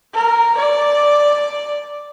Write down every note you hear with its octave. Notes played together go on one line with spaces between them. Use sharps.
A#4
D5